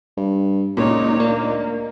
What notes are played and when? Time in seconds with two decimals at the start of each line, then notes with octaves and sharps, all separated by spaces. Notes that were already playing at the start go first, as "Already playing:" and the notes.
0.17 G2
0.77 C#2 A#2 D#4 C#5
1.20 D2 A#3 A#4 D5 D#5